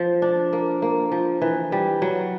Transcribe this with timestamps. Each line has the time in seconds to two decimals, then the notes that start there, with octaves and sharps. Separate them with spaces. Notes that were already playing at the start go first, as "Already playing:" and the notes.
Already playing: F3
0.22 D4
0.53 A#3
0.82 A#3
1.12 F3
1.42 E3
1.72 G3
2.02 F#3